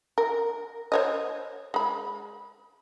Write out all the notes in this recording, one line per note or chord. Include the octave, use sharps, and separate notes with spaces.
A#4
C5 C#5 D#5
G#3 B5